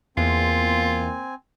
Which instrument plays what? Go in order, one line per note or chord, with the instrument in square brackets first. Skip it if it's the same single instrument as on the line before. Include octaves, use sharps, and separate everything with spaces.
[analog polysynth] E2 [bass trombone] A#3 [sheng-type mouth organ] C4 G#5 [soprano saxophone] F4